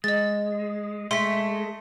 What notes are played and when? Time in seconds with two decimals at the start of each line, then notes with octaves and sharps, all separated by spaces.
0.04 G#3 D#5 A6
1.11 G#3 A3 C6 B6